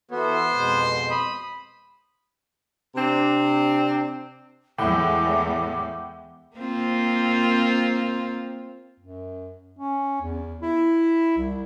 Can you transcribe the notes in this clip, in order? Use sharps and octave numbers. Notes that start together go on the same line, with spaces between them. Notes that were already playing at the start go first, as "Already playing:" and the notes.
E3 B3 F#4 A4 C5
F2 B2 G#3
B5 D#6
C3 C4 D4
E2 A2 G#3 E5 F#5 G5 D6
A#3 C4 F4
F#2
C#4
E2
E4
C2